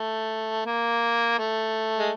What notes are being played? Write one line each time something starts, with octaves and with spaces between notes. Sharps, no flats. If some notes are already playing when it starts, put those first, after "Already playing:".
Already playing: A3
A#3
A3
G#3